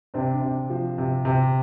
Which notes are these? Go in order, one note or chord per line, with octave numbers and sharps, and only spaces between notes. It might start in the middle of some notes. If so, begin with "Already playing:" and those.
C3 C4 D4
C3
F3
C3
C3